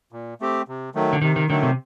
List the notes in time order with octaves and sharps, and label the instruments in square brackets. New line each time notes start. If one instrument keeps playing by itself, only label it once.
[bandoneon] A#2
A3 C4 G4
C3
D#3 F#3 A3
[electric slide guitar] D3
[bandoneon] C3 [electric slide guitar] D#3
[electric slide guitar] D#3
[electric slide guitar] D3 [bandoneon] D#3 F#3 A3
[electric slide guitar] C3